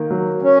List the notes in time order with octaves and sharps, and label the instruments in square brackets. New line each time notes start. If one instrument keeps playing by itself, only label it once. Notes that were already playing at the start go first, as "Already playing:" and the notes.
Already playing: [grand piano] D#3 A#3
F#3
[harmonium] C#4